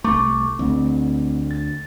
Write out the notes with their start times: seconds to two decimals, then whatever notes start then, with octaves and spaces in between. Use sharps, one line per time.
0.04 C2 A3 C#6 D6
0.59 D2 A3 C4
1.51 A6